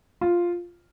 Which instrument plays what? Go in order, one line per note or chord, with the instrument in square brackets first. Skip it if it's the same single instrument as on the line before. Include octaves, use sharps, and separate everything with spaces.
[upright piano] F4